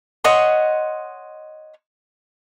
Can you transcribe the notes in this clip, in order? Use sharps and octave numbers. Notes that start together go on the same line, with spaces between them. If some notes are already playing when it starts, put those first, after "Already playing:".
C#5 D#5 F#5 C6